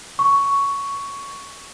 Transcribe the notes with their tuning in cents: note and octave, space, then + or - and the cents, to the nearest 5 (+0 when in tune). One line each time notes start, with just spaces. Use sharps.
C#6 +10